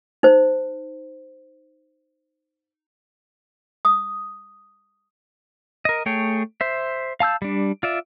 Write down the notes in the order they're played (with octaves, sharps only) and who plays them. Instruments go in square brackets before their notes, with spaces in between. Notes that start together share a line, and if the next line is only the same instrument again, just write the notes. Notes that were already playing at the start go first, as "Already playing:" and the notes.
[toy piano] D#4 C5
D#6
[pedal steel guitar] A#4 D#5
A3 G#4 C#5 G5
C5 E5
F5 A5 E6 G6
G3 D4
F4 D5 E5